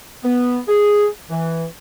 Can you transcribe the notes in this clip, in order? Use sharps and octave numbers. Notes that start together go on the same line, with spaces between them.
B3
G#4
E3